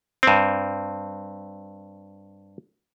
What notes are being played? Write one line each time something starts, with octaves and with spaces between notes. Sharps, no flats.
G2 C4